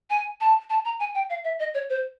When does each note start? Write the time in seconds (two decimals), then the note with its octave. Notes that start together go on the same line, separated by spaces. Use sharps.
0.10 G#5
0.41 A5
0.70 A5
0.85 A#5
0.99 G#5
1.15 G5
1.30 F5
1.44 E5
1.59 D#5
1.74 C#5
1.89 C5